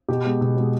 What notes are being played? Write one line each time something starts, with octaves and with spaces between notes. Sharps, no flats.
B2 G4
G#3 B3
B2
G#3 B3